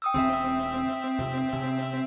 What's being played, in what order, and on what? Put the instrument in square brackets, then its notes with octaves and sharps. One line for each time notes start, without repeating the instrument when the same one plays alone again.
[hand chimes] G5 D#6 E6
[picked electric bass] E1 C#3 C#4 [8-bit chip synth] C4 E5
[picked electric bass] F2 C3
C3 C#4